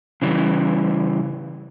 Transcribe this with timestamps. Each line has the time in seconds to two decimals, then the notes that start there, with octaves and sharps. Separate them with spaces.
0.22 C#3 E3 G3